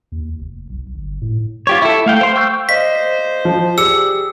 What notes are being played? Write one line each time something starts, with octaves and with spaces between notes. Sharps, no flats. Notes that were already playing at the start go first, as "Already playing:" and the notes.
D#2
F1
B1
G1
A2
F4 G4 C#5
E4 A4
A3 F5 G5
C5 C6
G5 C#6 E6 F6 G6
C5 D5 D#5 F5 B6
F3
G4 G#4 D5 E6 C#7